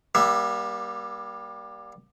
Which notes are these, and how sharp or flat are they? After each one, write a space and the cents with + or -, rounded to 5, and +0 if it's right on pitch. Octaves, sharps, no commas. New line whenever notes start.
G3 +0 A#3 +35 E5 +0